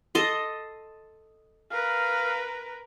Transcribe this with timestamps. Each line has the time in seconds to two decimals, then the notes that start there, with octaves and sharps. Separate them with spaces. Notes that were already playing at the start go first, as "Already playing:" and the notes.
0.15 A4 D#5 C6
1.72 A#4 B4 F5